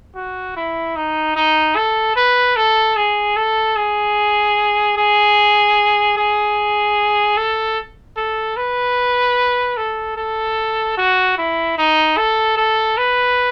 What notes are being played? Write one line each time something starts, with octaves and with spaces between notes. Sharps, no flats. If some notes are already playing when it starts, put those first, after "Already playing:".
F#4
E4
D#4
D#4
A4
B4
A4
G#4
A4
G#4
G#4
G#4
A4
A4
B4
A4
A4
F#4
E4
D#4
A4
A4
B4